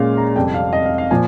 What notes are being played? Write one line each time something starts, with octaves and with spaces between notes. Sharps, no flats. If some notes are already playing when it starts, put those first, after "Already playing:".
Already playing: A#2 G#3 C#4 F5
A#5
F2 C3 G3 G5
F5
D#5
F5
F5
A#2 F3 G#5